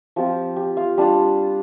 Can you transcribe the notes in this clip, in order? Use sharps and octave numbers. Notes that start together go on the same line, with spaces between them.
F3 C4 F4 G4
G4
F4 F5
G3 D4 F4